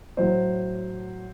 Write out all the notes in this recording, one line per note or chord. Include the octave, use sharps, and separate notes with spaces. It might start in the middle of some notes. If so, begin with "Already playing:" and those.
A2 F#3 C5